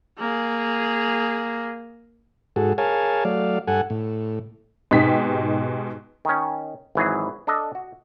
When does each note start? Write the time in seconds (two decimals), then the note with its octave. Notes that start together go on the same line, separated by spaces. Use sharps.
0.18 A#3 G#4
2.56 G#2 F#4 G#4 A4
2.78 G#4 A#4 C#5 F5 G#5 A5
3.25 F#3 A3 D5 F5
3.68 G2 A4 F#5 G#5
3.90 A2
4.91 G#2 B2 D#4 G4 B6
6.25 D#3 C#4
6.95 G#1 E3 F#3 G#4
7.47 D4 A4 D#5
7.75 F#4